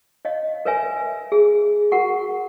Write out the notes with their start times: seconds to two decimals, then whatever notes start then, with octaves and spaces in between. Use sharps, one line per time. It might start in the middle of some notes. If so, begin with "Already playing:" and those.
0.25 C#5 D#5 F5
0.65 A#4 B4 C#5 E5 G#5
1.32 G#4
1.92 F#4 A#4 F#5 C#6